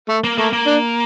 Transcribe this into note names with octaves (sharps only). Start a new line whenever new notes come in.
A3
A#3
A3 A#3
A#3
D4